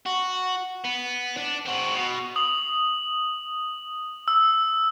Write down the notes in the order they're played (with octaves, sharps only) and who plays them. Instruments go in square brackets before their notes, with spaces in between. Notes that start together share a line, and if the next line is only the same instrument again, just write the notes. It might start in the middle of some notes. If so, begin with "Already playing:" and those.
[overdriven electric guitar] F#4
B3
D4
C4 F#4
B2
[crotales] D#6 F#7
E6